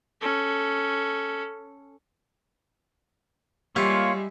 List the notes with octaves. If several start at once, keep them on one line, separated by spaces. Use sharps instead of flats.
C#4 A4
G3 G#3 A#3 E4 F4 G4 C#5